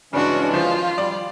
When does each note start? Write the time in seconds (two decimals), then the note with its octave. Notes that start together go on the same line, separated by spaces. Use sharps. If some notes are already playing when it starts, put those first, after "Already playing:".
0.13 G2 C#3 E3 G#3 C#4 D4 F#4
0.53 D#2 F3 F4 C5
0.98 G3 D5